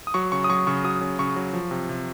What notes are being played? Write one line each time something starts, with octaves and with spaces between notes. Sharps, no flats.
D#6
F#3 C#6
C#3 C#6
D#6
F#3 C#6
C#3 C#6
F#3 D#6
C#3
C#3 C#6
F#3
F3
C3
C3